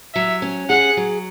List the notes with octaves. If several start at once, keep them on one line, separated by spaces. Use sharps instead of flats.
F#3 E5
C#4
G#4 F#5
F#3